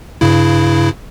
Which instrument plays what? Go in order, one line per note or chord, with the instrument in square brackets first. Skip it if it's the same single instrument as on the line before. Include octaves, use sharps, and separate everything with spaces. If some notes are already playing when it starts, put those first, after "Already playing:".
[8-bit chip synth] G2 C#3 E4